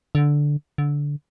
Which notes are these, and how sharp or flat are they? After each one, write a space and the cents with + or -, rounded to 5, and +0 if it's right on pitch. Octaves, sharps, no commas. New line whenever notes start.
D3 -5
D3 -15